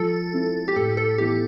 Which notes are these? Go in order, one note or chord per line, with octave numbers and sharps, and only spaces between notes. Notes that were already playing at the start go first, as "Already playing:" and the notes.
Already playing: F3 A4
C4 E4
G4
A2 A4
A4
E3 B3 E4 G4